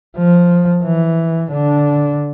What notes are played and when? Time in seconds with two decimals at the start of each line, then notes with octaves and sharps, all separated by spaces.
0.17 F3
0.83 E3
1.52 D3 D4